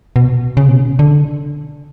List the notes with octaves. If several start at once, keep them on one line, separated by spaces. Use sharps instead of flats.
B2
C#3
B2
C#3
D3